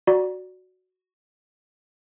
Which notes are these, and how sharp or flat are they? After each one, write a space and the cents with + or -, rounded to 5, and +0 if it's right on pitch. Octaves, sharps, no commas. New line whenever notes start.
F#4 +0 D5 +0 A#5 +25